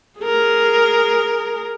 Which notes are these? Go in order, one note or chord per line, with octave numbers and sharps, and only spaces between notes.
G#4 A#4